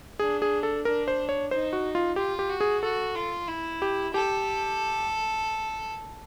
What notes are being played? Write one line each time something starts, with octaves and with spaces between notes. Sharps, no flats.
D4 G#4
G#4
A4
D4 A#4
C5
C#5
D#4 C5
F#4
F4
F4 G4
G4
F#4
G#4
F#4 A4
F4
E4
G4
G4 A4